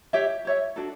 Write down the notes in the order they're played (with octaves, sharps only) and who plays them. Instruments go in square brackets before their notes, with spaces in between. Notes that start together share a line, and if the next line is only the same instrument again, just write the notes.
[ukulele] G4 C#5 E5
G4 C#5 E5
D4 F#4 A4